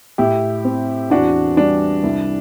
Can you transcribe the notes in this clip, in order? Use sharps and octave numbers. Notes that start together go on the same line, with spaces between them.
A2 E4 G4
C4
E2 D4 F#4
G3 D4
C2